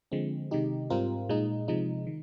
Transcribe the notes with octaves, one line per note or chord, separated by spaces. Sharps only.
D3 F3 G#3 C4
C3 D#3 G#3 D#4 G4
G#2 G3 C4 F4 A#4
A#2 G#3 D#4
C3 F3 G#3 D#4
D#3